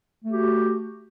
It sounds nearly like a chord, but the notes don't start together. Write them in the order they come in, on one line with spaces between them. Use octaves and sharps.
A3 G4 F#4